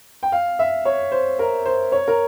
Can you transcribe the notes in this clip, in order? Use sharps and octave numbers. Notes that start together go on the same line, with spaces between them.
G5
F5
E5
C#5
C5
A#4
C5
C#5
A#4